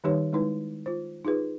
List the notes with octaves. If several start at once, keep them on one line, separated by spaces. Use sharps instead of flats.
D#3 G3 D#4 G4 B4 C#5
G#3 D#4 E4 B4
F4 C5
D#4 F4 G#4 B4